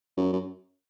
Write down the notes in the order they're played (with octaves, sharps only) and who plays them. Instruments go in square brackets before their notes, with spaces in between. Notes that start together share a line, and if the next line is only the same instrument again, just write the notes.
[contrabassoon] F#2
F#2